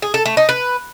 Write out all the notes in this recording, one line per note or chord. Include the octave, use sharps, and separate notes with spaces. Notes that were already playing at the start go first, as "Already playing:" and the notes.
G#4
A4
A3
D#4
B4